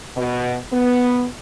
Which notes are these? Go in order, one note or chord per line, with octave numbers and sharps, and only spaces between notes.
B2
B3